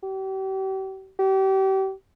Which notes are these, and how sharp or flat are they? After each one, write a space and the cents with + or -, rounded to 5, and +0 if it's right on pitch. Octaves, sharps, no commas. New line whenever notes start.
G4 -40
G4 -35